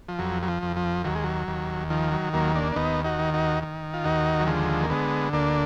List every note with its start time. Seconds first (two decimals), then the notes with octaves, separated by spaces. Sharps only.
0.08 F3
0.19 F2 F#3
0.43 F#3
0.48 F3
0.62 F2
0.76 F3
1.05 D#2 F#3
1.15 G#3
1.24 F#3
1.48 D#2
1.90 D#3 F3
2.11 F#3
2.33 D#2 F#3 A#3
2.55 A#3 D4
2.72 D4
2.76 D#2 B3 D#4
3.04 D#4 F#4
3.19 D#3
3.34 D#4 F#4
3.63 D#3
3.94 F4
4.04 D#2 D#4 F#4
4.40 F#3
4.47 D3 F3 G#3
4.83 A#3
4.90 D3 G#3 B3
5.33 D2 A#3 D4